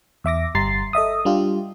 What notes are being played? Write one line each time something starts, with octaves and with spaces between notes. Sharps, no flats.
E2 E5 D6 A#6
G1 G3 A#5 C6 A6 C7
A4 D#5 E5 D#6
G3 D4 F4 G4